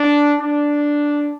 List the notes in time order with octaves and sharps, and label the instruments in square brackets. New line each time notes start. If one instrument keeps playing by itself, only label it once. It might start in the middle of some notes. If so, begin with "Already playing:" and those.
Already playing: [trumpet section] D4
D4